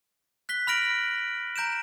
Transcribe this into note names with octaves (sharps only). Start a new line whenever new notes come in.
F#6 B6 G7
B5 F6 A#6 D7 F#7
A#5 G6 D7 E7